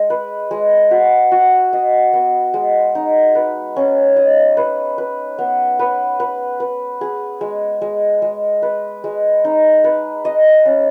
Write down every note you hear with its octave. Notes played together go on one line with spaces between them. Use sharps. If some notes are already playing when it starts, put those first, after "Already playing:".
Already playing: G#3
B4
G#3
F#4
F#4
D#5
B3
G#3
D#4
B4
C#4
D#5
B4
B4
B3
B4
B4
B4
G#4
G#3
G#3
G#3
B4
G#3
D#4
B4
D#5
C#4